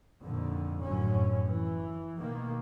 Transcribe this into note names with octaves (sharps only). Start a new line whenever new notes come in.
F2 A#2 D3 D#3
F1 F#2 A2 D3 C#4
E3
B2 D#3 A#3